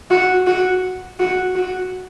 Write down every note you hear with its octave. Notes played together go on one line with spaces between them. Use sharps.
F#4
F#4
F#4
F#4